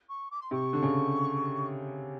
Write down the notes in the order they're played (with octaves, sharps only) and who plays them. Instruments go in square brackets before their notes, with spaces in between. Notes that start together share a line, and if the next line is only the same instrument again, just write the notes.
[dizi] C#6
D6
C6
[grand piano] C3 [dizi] C#6
[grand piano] D3
C#3